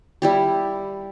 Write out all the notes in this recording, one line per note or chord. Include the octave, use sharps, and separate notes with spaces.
G3 E4 G4